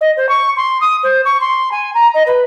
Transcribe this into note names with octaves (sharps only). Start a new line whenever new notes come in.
D#5
C5
C#6
C6
D#6
C5
C#6
C6
G#5
A#5
D#5
B4